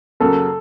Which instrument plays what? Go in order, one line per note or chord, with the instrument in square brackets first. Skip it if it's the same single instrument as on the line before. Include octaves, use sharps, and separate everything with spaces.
[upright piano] F#2 C#3 F#3 A#3 [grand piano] A4